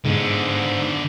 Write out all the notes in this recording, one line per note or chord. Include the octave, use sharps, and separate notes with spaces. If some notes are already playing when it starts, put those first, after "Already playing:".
G#2 D3 B3